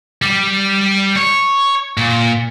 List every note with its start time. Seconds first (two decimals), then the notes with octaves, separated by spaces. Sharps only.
0.22 G3
1.16 C#5
1.97 A#2